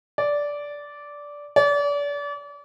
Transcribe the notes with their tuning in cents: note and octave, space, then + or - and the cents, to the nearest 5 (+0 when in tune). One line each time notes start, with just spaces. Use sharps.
D5 -10
D5 -35